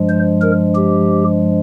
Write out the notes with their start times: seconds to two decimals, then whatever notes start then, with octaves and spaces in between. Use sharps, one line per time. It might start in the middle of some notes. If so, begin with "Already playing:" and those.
Already playing: G2 F3 G#3
0.09 C5
0.42 A#4
0.75 G4